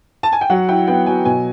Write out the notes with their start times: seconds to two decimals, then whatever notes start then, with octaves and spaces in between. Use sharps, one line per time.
0.23 A5
0.33 G#5
0.41 G5
0.50 F#3 F#5
0.69 E4 G5
0.88 B3 G5
1.06 F#3 G#5
1.25 B2 G#5